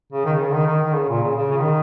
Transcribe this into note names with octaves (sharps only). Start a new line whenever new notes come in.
C#3
D#3
C#3
D#3
D#3
D#3
C#3
A#2
C#3
C#3
C#3
D#3